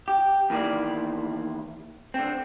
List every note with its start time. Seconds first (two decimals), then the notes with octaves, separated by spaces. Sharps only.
0.08 G4
0.50 E2 D#3 A#3 E4 D5
2.14 D3 C4